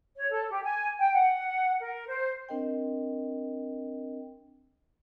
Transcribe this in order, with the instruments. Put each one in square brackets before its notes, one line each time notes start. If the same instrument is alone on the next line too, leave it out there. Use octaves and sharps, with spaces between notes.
[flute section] C#5
A4
G4
G#5
G5
F#5
A#4
C5
[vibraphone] C4 D4 A#4 D#5 G5